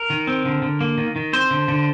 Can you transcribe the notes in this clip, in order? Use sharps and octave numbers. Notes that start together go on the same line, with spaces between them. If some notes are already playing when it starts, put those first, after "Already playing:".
Already playing: A#4
D#3
C4
D3
D3
A#3
D#3
D#3
C4 C5
D3
D3